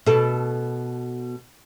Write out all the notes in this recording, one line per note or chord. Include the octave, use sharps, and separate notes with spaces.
B2 A4